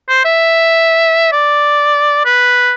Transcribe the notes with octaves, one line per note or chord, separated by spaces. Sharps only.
C5
E5
D5
B4